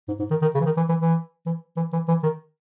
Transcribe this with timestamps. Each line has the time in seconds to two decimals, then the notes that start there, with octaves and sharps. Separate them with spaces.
0.08 G#2
0.19 G#2
0.30 D#3
0.42 D#3
0.55 C#3
0.61 E3
0.65 D#3
0.77 E3
0.89 E3
1.00 E3
1.46 E3
1.76 E3
1.93 E3
2.08 E3
2.23 D#3